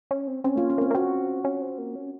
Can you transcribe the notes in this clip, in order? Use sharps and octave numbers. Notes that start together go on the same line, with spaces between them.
C#4
C4
C4 C#4
A3 A#3 F4
C#4
A#3 C4
A#3
C4 F#4
C#4
C4
A#3
C#4